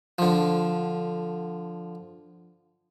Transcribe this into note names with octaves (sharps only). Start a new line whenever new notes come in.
D3 F3